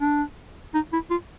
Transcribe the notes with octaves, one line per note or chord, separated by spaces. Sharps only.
D4
D#4
E4
F4